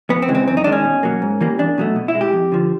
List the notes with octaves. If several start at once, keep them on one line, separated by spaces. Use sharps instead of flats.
F2 B3
C4
C#3 E3 G#3
C4
F#2 C4
D#4
D#3 G#3 D4
C#4
B2
F#3 A#3
G#2
E3 G3 A#3
E2 D4
B2 F#3 A3
B2
E4
G#3
G4
F2
D3 F3